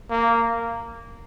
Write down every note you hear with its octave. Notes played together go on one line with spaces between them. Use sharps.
A#3